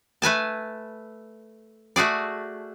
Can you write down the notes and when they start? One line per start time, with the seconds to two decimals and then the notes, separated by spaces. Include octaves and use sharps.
0.22 A3 B4 G#5 A5
1.96 A3 F#4 G#4 D5